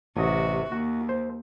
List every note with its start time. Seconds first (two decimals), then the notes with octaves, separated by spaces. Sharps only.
0.17 A1 C3 F#4 D#5
0.72 D#2 F#4
1.09 C5